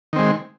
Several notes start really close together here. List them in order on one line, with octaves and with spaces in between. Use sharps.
D#3 C4 G#3